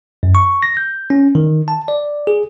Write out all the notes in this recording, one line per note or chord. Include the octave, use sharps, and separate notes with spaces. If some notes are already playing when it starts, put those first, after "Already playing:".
F#2
C#6
A#6
G6
C#4
D#3
A5
D5
G#4